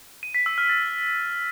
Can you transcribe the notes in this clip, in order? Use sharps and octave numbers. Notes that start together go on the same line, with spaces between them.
D#7
B6
E6
F6
A6